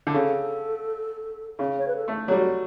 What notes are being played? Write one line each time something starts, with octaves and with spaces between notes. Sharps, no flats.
D3
C#3 A4
C#3
C#5
B4
A4
A3
F#3
G3 F#4